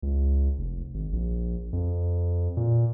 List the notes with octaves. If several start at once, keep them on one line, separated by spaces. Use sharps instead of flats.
C#2
F1
G#1
A#1
F2
A#2